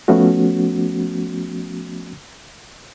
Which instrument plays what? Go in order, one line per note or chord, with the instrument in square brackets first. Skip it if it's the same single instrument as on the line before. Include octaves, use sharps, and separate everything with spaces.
[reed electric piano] F3 A3 B3 C#4 F#4